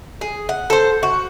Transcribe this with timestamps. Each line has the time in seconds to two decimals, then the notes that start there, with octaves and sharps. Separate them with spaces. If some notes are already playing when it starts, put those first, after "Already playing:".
0.21 G#4
0.49 F#5
0.70 A4 C5
1.03 F#4